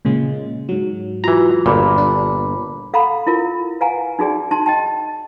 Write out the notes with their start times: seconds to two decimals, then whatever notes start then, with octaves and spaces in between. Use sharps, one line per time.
0.05 A#2 C#3 G#3
0.69 G#2 F#3
1.24 E3 F4 F#4 A#5
1.66 G1 A#2 B5 D6
1.98 D4
2.94 A4 F5 F#5 A#5 B5
3.27 E4 F4 A#4
3.81 B4 F5 F#5 G#5 A#5
4.19 D#4 F#4 G#4 D5 G5
4.51 D#4 A5 C6
4.66 D#5 G5 A5